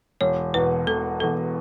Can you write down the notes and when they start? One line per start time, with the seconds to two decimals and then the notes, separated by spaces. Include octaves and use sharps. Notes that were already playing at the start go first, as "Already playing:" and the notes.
0.21 E1 C#5
0.54 E2 B2 B4
0.87 E1 A4
1.20 E2 B2 A4